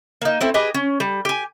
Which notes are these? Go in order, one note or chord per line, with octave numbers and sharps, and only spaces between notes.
A#3 D#4
A3 C4 E4
G4 G#4 B4 D#5
C#4
G3
G4 G#5